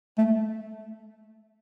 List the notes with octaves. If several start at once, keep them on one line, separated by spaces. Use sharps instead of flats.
A3